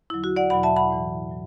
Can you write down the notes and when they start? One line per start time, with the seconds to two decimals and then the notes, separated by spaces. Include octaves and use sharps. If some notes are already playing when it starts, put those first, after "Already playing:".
0.10 E2 D3 F#3 E4
0.24 F#4
0.36 D5 F#5
0.50 E2 B2 F#3 F#5 B5
0.63 E5 A5
0.76 F#5 B5
0.90 A2 E3
1.30 A2 F#3